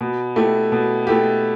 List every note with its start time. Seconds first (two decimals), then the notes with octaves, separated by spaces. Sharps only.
0.01 B2
0.36 A3 E4 G4
0.72 B2
1.07 A3 E4 G4